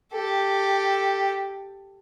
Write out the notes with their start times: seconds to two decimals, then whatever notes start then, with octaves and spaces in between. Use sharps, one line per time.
0.13 G4 A4